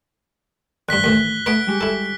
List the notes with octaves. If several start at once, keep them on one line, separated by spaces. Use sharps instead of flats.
E2 G2 F#6 B6 G7
D#2 A2 E3 F#6 B6
A3 B3 B4 B6 D7
G3 G#3 G4
E4 A4